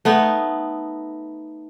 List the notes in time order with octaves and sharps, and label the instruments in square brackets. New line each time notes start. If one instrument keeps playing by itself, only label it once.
[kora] A3 B3 D#4